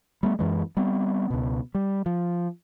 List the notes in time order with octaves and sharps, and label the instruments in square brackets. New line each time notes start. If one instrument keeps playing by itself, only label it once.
[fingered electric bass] G3 A3 B3
F#2 E3 G#3
G3 B3 C4
C#2 B2
G3
F3